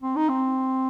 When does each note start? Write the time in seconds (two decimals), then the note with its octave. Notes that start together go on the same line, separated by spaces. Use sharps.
0.03 C4
0.16 D#4
0.29 C4